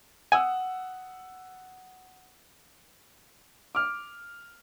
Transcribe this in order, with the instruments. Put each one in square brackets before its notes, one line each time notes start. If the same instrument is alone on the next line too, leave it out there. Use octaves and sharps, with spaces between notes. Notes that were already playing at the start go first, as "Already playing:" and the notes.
[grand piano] F#5 D#6 E6 [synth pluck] G#5
[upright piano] D6 F6